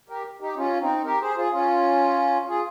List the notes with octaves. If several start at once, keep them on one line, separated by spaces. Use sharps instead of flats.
G4 A#4
D#4 G4
C#4 F4
C4 D#4
G4 A#4
G#4 C5
F4 G#4
C#4 F4
F4 G#4